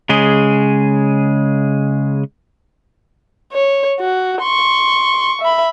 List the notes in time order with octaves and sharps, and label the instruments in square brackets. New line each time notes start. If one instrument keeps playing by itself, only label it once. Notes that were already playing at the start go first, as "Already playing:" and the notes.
[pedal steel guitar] C#3 G#3 G#4
[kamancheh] C#5
F#4
C6 C#6
E5 B5